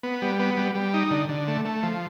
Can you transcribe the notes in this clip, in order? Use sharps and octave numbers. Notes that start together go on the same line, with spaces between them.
B3
G3
B3
G3
G3
D#4
D3
D3
A3
A3
F3